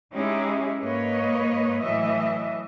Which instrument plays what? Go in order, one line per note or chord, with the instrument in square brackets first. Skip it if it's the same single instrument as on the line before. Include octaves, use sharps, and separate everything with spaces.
[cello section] G#3 C#4 D#4 E4 G4 G#4
G#2 A#3 B4 C#5 D#5
A2 E3 F#3 D#5 E5